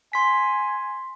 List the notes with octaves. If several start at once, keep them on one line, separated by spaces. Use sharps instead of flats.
G#5 C6 B6